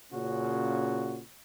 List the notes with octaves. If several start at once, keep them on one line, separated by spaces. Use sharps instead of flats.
A#2 C#3 C#4 F#4